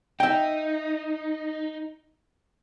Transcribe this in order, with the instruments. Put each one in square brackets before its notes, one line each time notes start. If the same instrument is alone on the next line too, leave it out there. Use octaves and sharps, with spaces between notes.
[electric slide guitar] D#4 [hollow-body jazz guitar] E5 G5